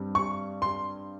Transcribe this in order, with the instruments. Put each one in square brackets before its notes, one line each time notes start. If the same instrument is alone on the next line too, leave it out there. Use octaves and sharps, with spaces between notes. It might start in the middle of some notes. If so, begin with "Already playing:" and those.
Already playing: [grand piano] G2 G3 C4
[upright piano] C#6
C6